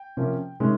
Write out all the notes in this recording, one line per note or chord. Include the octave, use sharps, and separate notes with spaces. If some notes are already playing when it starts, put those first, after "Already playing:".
Already playing: G5
C3 F3 A#3 C#4
C3 D#3 G#3 C#4